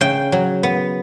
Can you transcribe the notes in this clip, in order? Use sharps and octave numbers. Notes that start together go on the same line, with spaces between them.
C#3 G5
F#3
B3